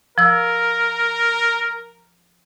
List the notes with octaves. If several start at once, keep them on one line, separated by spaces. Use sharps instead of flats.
F3 A#4 E6